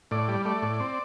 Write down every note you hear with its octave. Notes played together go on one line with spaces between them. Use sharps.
A2 D5
G3
A3 D5
A2
C4